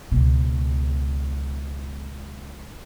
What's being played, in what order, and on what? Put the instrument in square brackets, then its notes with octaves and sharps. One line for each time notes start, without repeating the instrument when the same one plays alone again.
[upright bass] C#2 B2